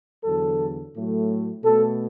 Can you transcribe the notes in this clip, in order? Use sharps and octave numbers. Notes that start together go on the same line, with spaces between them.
E2 D3 F#3 A4
A2 F#3 A3
B2 A3 A4